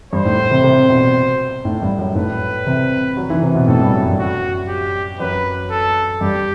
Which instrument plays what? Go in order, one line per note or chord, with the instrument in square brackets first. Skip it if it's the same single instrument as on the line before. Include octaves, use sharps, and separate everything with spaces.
[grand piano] G2 [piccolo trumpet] C5
[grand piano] A2
C3
C3
B2
A2
G2
F#2
[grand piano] A2 [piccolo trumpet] B4
[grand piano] C3
F#3
E3
C3
B2
[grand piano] A2 [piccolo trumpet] A4
[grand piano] G2
F#2
G2
[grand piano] F#2 [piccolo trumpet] F#4
[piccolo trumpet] G4
[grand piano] F#2 [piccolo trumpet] B4
[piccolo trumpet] A4
[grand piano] G2 [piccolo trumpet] G4